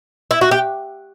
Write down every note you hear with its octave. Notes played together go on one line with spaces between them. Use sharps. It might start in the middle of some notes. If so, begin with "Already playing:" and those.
E4
F#4
G4